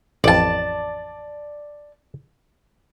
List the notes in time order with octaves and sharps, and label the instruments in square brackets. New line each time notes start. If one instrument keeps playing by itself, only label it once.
[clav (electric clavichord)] A1 F2 [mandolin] D5 A5